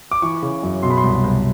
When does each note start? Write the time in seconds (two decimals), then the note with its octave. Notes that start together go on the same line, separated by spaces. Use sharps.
0.11 D6
0.22 E3 C#6
0.42 C#3
0.63 F#2
0.83 B2 C6
0.91 B5
0.98 C6
1.04 C2
1.24 C2